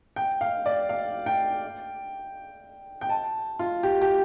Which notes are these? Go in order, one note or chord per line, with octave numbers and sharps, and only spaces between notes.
G5
F5
D5
F5
G5
G5
A5
F4
G4
G4